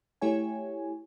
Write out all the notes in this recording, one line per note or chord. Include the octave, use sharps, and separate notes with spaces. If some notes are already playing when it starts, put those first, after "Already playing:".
A3 E4 G4 C#5 G#5